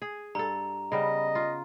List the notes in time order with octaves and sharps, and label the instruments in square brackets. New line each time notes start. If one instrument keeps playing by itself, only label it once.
[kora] G#4
[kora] G2 A4 [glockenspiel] A#5
[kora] C#3 G3 B3 [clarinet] D#5
[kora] F4